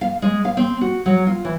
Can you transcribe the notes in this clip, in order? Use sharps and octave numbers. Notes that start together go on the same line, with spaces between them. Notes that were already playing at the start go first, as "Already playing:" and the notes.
F5
G#3
F5
C4
F#4
F#3
F4
E3